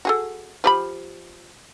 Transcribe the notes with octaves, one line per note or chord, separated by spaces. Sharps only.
F#4 G#4 A4
F3 G4 B5